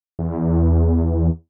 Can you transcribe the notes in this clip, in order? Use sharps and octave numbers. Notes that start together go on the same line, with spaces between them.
E2